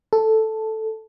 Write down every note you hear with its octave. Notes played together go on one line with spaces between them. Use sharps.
A4